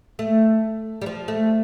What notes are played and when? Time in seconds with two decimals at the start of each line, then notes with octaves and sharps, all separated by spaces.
0.19 A3
1.02 G3
1.06 F3
1.28 A3